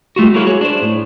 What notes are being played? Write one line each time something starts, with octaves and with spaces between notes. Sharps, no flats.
G3 A3 F4 F#4
F#3 G#3 A#3 E4 F#4 G#4
G#4 C#5
D4 C5
A2